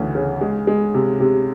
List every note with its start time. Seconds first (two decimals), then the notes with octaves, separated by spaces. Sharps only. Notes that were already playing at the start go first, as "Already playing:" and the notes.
Already playing: D2 C#3 E3
0.15 C#3
0.41 G#3
0.67 G#3
0.94 C3
1.20 C3